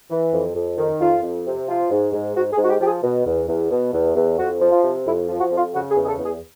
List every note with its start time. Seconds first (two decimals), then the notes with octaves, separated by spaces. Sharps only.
0.11 E3
0.33 F2
0.56 F2
0.78 D#3
1.01 F2 F4
1.23 F2
1.46 C3
1.68 F3 F4
1.91 G#2
2.13 G#2
2.35 G#2 F#4
2.53 G#4
2.58 G#2 F#4
2.70 G4
2.81 F3 G4
2.86 G#4
3.03 B2
3.26 E2
3.48 E2
3.71 B2
3.94 E2
4.16 E2
4.39 F2 F#4
4.61 F3
4.72 F4
4.84 C3
5.06 F2 E4
5.29 F3
5.40 F#4
5.52 F2
5.57 F4
5.74 C#3 F#4
5.91 G#4
5.96 E2
6.03 G#4
6.08 A4
6.19 E2
6.24 G#4